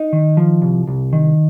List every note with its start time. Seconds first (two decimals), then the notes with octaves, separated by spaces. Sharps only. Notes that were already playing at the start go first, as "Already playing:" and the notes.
Already playing: D#4
0.13 D#3
0.37 F3
0.62 C2
0.88 C2
1.13 D#3